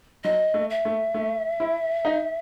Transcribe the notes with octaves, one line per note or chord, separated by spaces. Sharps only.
F#3 D#5
A3
E5
A3
A3
E4
D#4